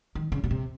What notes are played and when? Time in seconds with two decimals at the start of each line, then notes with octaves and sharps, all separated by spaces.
0.15 D#3
0.32 C#3
0.44 B2
0.51 C3